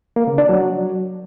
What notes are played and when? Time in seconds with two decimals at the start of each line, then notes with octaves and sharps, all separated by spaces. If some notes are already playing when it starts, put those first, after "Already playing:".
0.16 A#3
0.27 C#3
0.38 D4
0.49 F#3